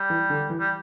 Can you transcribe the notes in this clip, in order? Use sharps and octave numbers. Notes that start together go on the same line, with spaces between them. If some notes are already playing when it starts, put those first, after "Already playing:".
Already playing: G3
E3
D3
E3
G3